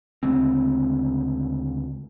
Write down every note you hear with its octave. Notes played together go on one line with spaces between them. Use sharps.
D2 C#3 G#3 C4